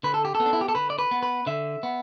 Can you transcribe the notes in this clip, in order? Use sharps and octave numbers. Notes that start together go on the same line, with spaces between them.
D3 B4
A4
G4
A4
B3
D4
E4
G4
A4
D3 B4
D5
B4
B3
B4
D3 E5
B3